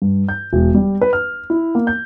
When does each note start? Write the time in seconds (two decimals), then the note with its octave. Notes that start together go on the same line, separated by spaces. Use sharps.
0.02 G2
0.29 G6
0.53 E1
0.74 G3
1.01 B4
1.13 F6
1.50 E4
1.75 A#3
1.87 G6